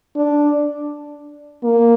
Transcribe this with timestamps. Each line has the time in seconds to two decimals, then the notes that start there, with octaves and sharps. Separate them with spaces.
0.16 D4
1.64 A#3